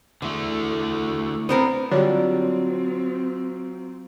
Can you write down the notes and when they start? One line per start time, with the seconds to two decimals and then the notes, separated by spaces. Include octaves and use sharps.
0.22 E2 D3 A3
1.49 B3 C4 D4 A#4
1.91 D3 F#3 G3 C4 D4 F4 C#5